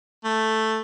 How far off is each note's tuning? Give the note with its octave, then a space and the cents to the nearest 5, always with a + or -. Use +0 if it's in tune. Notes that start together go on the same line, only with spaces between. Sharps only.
A3 +0